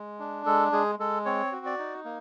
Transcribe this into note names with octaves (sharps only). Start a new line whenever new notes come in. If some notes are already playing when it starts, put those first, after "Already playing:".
Already playing: G#3
D4
G#3 A4
G#3 G#4
G#3 A4
C4 C#5
F#4
D5
D#4
A#3